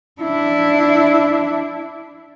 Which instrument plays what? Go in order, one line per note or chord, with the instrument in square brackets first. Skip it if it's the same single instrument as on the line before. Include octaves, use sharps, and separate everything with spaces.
[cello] D4 E4